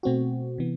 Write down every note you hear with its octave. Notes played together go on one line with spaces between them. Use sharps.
B2 A3 C4 F#4
C3 E3 B3